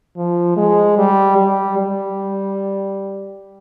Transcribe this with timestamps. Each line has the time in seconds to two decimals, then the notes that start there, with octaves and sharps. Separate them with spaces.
0.17 F3
0.57 G#3
0.98 G3
1.37 G3
1.78 G3